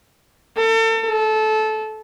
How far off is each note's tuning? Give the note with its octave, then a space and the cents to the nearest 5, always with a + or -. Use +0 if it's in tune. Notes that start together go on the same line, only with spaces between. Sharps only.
A4 +35
A4 -20